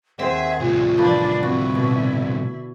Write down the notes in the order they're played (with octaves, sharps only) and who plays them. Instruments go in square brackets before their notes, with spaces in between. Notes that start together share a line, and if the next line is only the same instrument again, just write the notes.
[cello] D#2 G#4 [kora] C4 C5 [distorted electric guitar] E5 [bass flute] F#5
[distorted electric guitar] C2 A2 [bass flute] F4
[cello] E3 D4 [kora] F3 A#3 B4
[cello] D3 E4 [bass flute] C4 [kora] F#4
[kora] B2